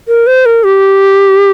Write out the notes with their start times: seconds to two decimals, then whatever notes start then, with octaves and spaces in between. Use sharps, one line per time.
0.08 A#4
0.27 C5
0.46 A#4
0.64 G4